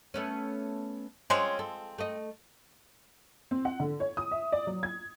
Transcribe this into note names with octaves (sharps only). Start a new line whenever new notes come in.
A3 B3 C#4
F3 G#3 C4 C#4
A4
A3 D#5
C4
F#5
D3
C#5
D#6
E5
D5
F#3
G#6